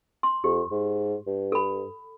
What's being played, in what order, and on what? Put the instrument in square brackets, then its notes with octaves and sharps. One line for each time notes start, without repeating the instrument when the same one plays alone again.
[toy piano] C6
[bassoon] F2 [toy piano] G4
[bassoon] G#2
G2
[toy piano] A4 B5